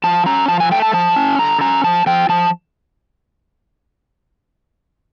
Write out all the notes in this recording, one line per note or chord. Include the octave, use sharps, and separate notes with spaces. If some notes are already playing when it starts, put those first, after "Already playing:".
F3 A5
C#4 A#5
F3 A5
G#5
A3 G5
A5
F3 A5
C#4
D3 A#5
C#4 A#5
F3 A5
F3 G5
F3 A5